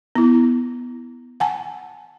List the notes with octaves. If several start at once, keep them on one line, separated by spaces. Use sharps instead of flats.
B3 E4
F#5 G#5 A5